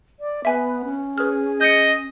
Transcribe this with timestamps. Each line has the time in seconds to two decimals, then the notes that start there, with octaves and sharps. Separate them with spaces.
0.20 D5
0.45 B3 B4 E5 G#5
0.85 C#4
1.18 G#4 B4 F6
1.61 D#5 G6 A#6 C#7